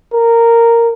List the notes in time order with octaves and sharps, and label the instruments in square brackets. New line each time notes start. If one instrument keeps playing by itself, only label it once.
[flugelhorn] A#4